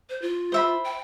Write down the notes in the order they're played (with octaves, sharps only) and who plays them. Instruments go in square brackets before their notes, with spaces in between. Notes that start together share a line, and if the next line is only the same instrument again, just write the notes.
[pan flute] C5
F4
[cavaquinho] C5 E5 B5
[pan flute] G5